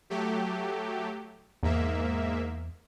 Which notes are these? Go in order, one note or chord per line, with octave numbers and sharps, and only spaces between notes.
F#3 A3 G4
E2 G#2 A#3 E5